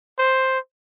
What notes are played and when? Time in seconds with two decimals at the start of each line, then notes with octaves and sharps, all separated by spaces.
0.18 C5